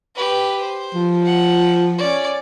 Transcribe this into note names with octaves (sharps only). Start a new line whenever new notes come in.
G4 B4
C5
F3
F#5
C#4 D5